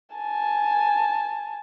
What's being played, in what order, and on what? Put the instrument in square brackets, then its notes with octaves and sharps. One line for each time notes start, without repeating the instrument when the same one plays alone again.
[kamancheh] G#5 A5